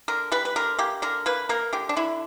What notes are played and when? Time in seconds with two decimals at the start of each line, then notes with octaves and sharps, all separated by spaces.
0.08 D3 A#4
0.32 G3 B4
0.45 B4
0.56 D3 A#4
0.79 A#3 G4
1.02 D3 A#4
1.26 A#3 B4
1.49 A#3 A#4
1.73 D3 G4
1.89 D4
1.97 D3 E4